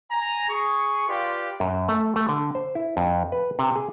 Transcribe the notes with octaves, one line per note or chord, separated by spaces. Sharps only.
G#5 A#5
G#4 C#6
F4 G4 B4 D5 F5 C6
F#2
A3
A3
D3
C5
E4
F2
B4
C3
G#4